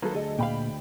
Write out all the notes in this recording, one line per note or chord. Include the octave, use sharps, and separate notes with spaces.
D#3 F#3 A#3 A4 B4
D2 G#4 D#5
A#2 F5 G5 B5